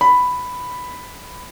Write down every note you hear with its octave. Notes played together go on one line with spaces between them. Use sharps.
B5